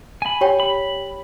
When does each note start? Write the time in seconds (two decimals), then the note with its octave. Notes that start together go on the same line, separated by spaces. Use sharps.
0.22 G#5 B5
0.41 G4 C#5 G5
0.60 B5